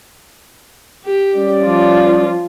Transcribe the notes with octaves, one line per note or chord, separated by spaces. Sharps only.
G4
G3 C#4 D5
F3 F4